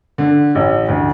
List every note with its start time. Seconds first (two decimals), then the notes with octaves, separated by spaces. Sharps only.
0.18 D3
0.55 A1
0.88 D2